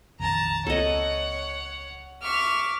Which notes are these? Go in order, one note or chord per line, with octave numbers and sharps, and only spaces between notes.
A#1 F2 D#3 A5 A#5
C#2 A#3 C4 A4 C#5 D#5 F#5
E5 C#6 D6 F6